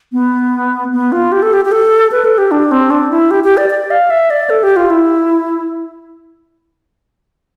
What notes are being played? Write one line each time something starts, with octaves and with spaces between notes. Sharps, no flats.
B3
B3
F4
G4
A4
G4
G4
A4
B4
A4
G4
D4
C4
D4
E4
G4
G4
D5
D5
F5
E5
D5
A4
G4
F4
E4